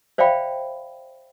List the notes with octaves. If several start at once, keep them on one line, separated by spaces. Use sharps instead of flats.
C5 D5 E5 F5 G5 B5